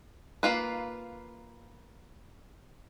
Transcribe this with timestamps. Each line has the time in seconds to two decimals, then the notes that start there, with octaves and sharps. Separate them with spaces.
0.43 A#3 F4 B4